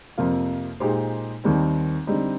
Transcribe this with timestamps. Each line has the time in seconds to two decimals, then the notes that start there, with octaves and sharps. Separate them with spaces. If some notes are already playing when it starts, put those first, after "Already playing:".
0.18 F2 C3 F3 A#3 F4
0.80 A#2 G#3 D#4 G4 C5
1.44 D#2 D#3 G3 C4
2.07 D3 G3 C4 D#4